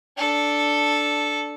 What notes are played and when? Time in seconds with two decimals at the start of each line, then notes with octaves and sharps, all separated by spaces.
0.17 D4 A4